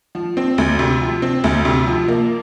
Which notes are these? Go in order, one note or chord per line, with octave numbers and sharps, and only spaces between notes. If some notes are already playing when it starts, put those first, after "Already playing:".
F3
C4
D2
C3
F3
C4
D2
C3
F3
A#3